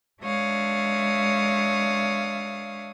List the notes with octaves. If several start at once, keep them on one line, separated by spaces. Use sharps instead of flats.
G#3 D4 C#5 E5 F5 D#6